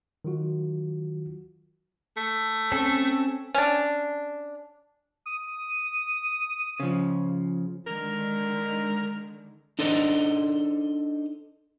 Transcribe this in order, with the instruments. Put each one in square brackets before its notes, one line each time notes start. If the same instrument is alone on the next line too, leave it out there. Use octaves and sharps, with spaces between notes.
[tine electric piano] D#3 F#3 F4 F#4
[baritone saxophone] A3
[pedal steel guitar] C4 C#4 A4
[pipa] C#4 D4
[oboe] D#6
[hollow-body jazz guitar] C#3 F3
[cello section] D3 D#3 G#3 [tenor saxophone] A#4
[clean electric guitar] D4 D#4 A4 C5 D5 D#5